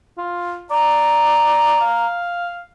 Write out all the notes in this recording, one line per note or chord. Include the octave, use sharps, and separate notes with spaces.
F4
D5 A#5
F5